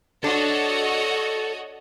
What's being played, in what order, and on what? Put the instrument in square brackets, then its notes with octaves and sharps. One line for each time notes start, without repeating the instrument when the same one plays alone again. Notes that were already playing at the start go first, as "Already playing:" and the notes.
[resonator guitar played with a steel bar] D4 [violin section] F#4 C#5 D#5 [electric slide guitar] A4